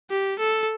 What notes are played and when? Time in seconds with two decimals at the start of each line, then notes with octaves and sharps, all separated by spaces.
0.10 G4
0.39 A4